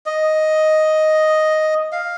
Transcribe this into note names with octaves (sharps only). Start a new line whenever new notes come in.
D#5
F5